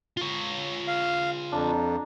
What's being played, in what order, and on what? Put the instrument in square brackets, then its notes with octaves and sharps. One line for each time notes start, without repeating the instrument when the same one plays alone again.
[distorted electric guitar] F4 C#5
[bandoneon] F5
[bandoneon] F2 [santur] D4 A#5